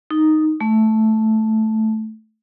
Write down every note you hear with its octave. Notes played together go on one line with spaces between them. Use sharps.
D#4
A3